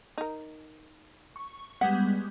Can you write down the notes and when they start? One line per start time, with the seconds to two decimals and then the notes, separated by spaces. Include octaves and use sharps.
0.18 D#4 A#4
1.36 C#6
1.81 G3 G#3 B3 F#5